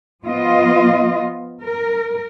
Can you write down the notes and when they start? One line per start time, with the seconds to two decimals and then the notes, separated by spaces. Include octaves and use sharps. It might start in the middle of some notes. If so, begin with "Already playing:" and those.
0.24 F3 B3 F4 D#5
1.62 A#4